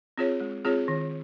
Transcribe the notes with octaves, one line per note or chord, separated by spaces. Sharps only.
C4 F4 G#4 C#5
G#3
C4 F4 G#4 C#5
D#3